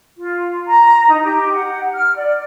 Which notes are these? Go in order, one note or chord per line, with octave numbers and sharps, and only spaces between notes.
F4
A#5
D#4
G4
F#5
F6
D5